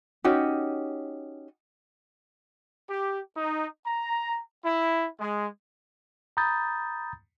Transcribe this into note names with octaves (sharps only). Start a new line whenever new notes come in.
C#4 D#4 F#4 G4
G4
D#4
A#5
E4
G#3
A#5 B5 D#6 G6 A6